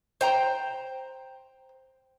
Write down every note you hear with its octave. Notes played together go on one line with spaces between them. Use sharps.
C5 G5 A#5